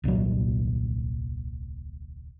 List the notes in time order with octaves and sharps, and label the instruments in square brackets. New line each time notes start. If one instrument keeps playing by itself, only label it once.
[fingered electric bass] D#1 C2 A#2 F#3